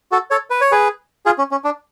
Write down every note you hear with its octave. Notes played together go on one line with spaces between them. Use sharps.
F#4 A4
A4 C#5
B4
C#5
G#4 B4
F4 G#4
C#4
C#4
D4